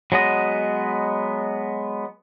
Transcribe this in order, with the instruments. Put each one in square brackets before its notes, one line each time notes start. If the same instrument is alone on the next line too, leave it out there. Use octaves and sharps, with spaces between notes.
[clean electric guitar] F#3 G#3 B3 D#5